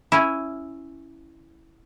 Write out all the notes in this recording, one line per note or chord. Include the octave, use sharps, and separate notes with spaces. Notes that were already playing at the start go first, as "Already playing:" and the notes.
C#4 E4